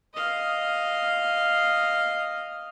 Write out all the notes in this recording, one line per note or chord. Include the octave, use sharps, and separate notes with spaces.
D#5 F5